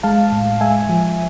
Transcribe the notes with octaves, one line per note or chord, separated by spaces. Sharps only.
G#3 F5 A5
A2
G#3 E5 G#5
F3